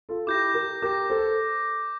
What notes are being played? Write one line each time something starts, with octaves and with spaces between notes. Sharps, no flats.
F4 A4
E4 G4 D6 G6 A#6
G4 A#4
G4 A#4 D6 G6 A#6
A4 C5